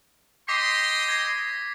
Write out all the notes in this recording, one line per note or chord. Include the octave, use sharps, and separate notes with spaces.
D#5 G5 C6 D6 B6 C7
G#6 A#6 C7